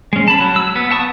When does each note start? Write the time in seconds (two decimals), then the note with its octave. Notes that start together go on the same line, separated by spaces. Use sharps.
0.13 G#3 C#4
0.28 A5 B5
0.41 F#3
0.56 E6
0.76 B3
0.91 F#5 A5 C#6 D#6